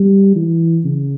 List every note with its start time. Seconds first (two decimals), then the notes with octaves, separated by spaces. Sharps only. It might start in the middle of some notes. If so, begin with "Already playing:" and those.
Already playing: G3
0.36 E3
0.85 C#3